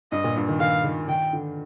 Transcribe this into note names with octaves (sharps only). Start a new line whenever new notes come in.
G2 D#5
A#2
G2
D#3
D#3 F5
D#3
D#3 G5
D3